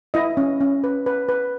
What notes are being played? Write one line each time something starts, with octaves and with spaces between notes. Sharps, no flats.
E4 D#5
C#4
C#4
B4
B4
B4